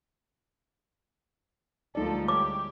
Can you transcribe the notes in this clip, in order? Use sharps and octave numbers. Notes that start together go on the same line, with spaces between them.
D2 F3 G3 G#3 A#3 D#4 A4 D5
G4 C#5 D6